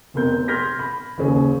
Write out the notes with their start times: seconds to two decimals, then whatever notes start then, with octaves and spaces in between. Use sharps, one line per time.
0.14 F1 B2 C4 A#4 G6
0.48 C6 F6 G6 G#6 A#6 B6
0.79 B5
1.18 F#1 D#2 C#4 G#4